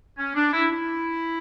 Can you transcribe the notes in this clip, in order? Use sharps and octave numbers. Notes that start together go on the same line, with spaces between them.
C#4
D4
E4
E4